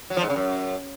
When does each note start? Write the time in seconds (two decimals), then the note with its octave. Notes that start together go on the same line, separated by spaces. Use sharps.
0.10 F#3
0.17 F3
0.23 G#2
0.30 C#3
0.36 F#2